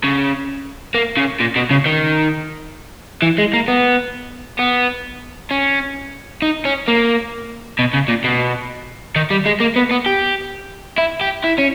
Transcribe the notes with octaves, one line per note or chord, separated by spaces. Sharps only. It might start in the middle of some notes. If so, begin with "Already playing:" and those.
C#3
A#3
C#3
A#2
B2
C#3
D#3
E3
G#3
A#3
B3
B3
C#4
D#4
C#4
A#3
B2
C#3
A#2
B2
D#3
G3
G#3
A#3
B3
B3
G4
E4
G4
E4
C#4